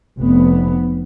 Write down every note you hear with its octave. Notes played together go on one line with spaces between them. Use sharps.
F1 B3